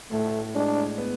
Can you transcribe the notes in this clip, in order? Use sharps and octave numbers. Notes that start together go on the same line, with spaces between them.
A2 A3
G#3 D4
B3